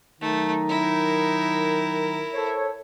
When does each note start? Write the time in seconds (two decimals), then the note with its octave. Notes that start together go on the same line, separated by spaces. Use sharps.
0.21 D#3 F#3 A3 D#4
0.69 E4 A#4
2.33 A4 C5 C#5